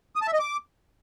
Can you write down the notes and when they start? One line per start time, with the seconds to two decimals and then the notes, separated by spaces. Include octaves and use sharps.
0.16 D#6
0.22 A5
0.27 E5
0.33 D#5
0.39 D6